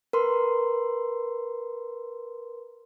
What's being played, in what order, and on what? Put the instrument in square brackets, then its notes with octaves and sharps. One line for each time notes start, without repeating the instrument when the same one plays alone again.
[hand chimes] A#4 B4 C6